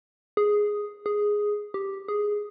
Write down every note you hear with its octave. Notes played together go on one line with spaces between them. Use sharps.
G#4
G#4
G4
G#4